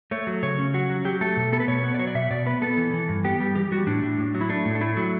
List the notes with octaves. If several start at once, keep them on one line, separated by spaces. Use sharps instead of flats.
A3 C#5
F#3
C#3 C#5
C#4
F#3 F#4
F#3
F#3 G4
A3 A4
B2
B3 A4
B4
B2 C#5
B3
D5
F#3 C#5
D5
B2 E5
B2 D5
B3 B4
B3 A4
E3
E3
G2
B3 G4
G3
E3 G4
G3 F#4
A2 D4
A2
A2
F#3
E4
A3 D4
A2
D4
A3 E4
F#3